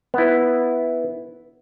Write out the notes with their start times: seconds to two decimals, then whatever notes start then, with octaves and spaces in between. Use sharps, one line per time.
0.14 B3 E4